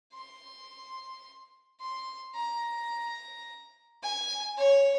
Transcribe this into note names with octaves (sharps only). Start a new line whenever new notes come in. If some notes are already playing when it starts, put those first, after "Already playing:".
C6
C6
A#5
G#5
C#5